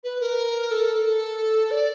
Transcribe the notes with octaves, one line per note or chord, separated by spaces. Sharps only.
B4
A#4
A4
A4
D5